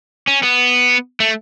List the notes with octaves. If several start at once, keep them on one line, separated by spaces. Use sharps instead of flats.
C#4
B3
A3